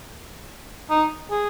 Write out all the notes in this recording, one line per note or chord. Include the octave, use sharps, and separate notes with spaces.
D#4
G#4